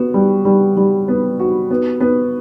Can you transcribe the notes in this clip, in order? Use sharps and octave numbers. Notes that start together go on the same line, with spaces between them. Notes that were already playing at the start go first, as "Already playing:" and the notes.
Already playing: B3 F#4
G3
G3
G3
B3
F#4
B3
B3